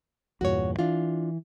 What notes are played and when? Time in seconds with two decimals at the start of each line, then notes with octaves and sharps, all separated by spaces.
0.41 E2 G2 A#2 F#4 C#5
0.79 E3 D4 F4